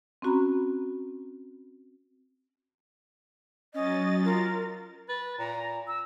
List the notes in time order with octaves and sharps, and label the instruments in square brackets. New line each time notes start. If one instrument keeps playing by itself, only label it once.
[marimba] C4 C#4 F#4 A#5 B5
[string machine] F#3 A6 [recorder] C#4 [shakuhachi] D#5
[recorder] F4 [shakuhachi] A#4
[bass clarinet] B4 [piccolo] A6
[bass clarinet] A#2 [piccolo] A#5
[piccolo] E6